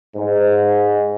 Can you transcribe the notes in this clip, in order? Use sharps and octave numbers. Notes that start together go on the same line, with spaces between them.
G#2